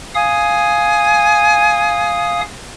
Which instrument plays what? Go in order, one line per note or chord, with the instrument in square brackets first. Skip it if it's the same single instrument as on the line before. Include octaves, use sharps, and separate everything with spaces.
[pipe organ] F5 D#6 [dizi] G#5